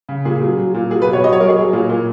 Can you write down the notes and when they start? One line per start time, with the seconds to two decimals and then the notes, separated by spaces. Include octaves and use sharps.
0.09 C#3
0.25 A#2 G#4
0.42 F#3
0.58 F#3
0.74 A#2
0.91 F#3 G#4
1.02 B4
1.07 B2
1.13 C#5
1.24 F#3 D#5
1.33 C#5
1.40 F#3 A#4
1.49 G#4
1.57 F#3
1.73 A#2
1.89 A#2